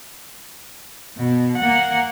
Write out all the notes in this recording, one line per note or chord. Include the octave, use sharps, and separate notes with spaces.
B2
A#3 F#5